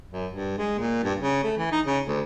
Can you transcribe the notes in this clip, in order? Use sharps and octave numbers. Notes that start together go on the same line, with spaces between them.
F#2
G2
G#3
A#2
G2
C#3
A3
E3
D#4
C#3
D2